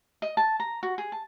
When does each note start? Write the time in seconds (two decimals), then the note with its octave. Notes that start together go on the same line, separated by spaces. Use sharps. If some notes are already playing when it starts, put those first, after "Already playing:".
0.22 D#5
0.37 A5
0.60 A#5
0.83 F#4
0.98 G#4
1.12 A5